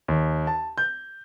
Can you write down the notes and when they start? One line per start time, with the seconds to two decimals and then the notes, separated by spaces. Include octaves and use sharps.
0.08 D#2
0.47 A5
0.78 G6